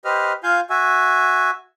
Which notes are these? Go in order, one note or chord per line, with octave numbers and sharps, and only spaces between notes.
G4 B4 C5 D#5 F6
F4 F5 G#5 G6
F#4 E5 G#5